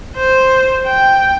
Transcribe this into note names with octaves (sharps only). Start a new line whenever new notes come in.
C5
G5